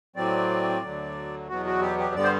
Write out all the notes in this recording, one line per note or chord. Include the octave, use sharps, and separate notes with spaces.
A2 F#3 C4 D5
D2 D3 F#3
E2 B2 F#3 B3 F#4
F#4
G4
G4
G2 D3 G3 B3 D5
C5